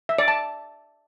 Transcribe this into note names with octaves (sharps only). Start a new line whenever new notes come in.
E5
D5
A5